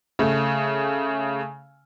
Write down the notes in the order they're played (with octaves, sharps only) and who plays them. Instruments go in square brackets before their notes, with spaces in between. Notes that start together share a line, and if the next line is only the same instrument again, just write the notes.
[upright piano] C#3 A3